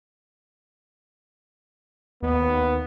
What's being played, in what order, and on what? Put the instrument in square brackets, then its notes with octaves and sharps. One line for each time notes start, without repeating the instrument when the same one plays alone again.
[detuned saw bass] D#2 [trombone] B3